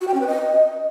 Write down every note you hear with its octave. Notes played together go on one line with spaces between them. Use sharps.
F#4
G5
C#4
B4
D#5